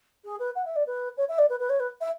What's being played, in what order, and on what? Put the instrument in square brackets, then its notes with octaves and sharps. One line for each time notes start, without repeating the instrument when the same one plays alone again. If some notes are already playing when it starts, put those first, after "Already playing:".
[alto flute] G#4
B4
F#5
E5
D5
B4
C#5
E5
D5
B4
B4
C#5
B4
E5